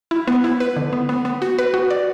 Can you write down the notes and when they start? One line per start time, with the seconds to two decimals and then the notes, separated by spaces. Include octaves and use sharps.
0.11 E4
0.28 B3
0.44 E4
0.60 B4
0.77 D3
0.93 B3
1.09 B3
1.25 B3
1.42 F#4
1.59 B4
1.74 F#4
1.90 D5